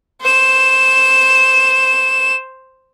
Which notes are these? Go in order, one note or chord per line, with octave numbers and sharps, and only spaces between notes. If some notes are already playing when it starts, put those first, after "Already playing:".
C5 E7